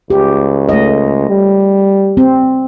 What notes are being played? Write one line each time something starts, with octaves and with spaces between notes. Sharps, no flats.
C#2 G4
A3 D#5
G3
C4